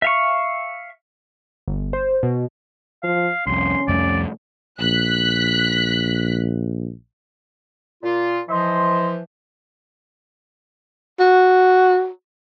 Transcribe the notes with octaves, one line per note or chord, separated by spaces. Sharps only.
E5 F5 C#6
G1
C5
B2
F3 F5
C2 F2 C#4 C6
C2 F2 A3 D5
A#1 F#6 B6
A#2 F4
E3 F3 C5 D#5 C6
F#4